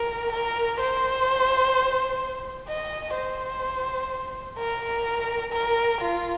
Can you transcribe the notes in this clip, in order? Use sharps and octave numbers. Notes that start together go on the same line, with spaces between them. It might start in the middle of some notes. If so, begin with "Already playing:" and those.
Already playing: A#4
A#4
C5
D#5
C5
A#4
A#4
F4